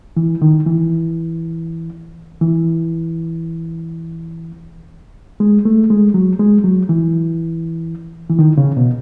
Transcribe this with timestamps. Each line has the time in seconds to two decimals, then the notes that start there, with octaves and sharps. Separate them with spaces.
0.17 E3
0.42 D#3
0.67 E3
2.42 E3
5.40 G#3
5.65 A3
5.90 G#3
6.14 F#3
6.40 G#3
6.64 F#3
6.89 E3
8.30 E3
8.39 D#3
8.58 C#3
8.77 B2